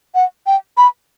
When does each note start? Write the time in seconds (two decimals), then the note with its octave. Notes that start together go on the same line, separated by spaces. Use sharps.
0.15 F#5
0.47 G5
0.77 B5